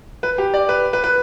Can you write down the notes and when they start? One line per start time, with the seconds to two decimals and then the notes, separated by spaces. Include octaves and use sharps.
0.23 B4
0.38 G4
0.54 D5
0.69 B4
0.93 B4
1.04 B4